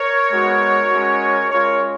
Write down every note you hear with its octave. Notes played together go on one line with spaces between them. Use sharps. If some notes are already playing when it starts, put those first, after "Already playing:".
Already playing: A#4 C#5
G#3 B3 D#4 F#4
G#3 C#4 F#4
G#3 C#4 F4 A#4 C#5